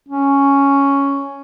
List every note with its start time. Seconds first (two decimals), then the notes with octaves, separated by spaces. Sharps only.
0.08 C#4